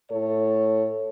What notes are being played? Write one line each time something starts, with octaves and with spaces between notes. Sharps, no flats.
A2 A3 A4 C#5